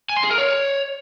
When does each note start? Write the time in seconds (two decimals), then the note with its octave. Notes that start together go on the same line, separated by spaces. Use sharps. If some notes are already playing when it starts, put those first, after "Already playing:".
0.09 G#5
0.17 C6
0.24 G#4
0.31 A#4
0.38 C#5